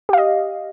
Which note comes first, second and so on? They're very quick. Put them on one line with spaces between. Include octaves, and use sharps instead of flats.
G4 F5 D#5